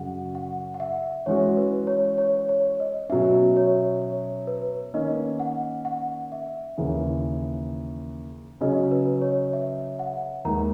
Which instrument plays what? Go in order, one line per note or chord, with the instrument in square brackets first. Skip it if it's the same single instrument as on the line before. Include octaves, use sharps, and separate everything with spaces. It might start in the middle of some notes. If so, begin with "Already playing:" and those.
Already playing: [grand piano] F#2 C#3 F#3 C#4 [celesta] F#5
[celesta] F#5
F#5
E5
[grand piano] E3 G#3 C#4 F#4 [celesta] C#5
[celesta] B4
C#5
C#5
C#5
D#5
[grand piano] B2 F#3 C#4 [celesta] E5
[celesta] C#5
C#5
B4
[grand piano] D#3 A#3 C#4 [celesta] D#5
[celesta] F#5
F#5
E5
[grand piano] D#2 C#3 E3
[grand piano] C#3 F#3 C#4 [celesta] D#5
[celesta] B4
C#5
E5
F#5
[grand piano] D#2 D#3 G#3 [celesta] A#5